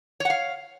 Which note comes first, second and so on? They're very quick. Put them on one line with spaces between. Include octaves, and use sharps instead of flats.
C#5 F#5 F5